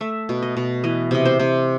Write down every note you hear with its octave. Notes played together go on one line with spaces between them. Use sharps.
A3 E5
B2
D#5
B2
E3 D#5
C3 D#5
C5
C3